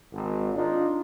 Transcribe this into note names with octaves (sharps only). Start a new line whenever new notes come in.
G#1
D4 D#4 F4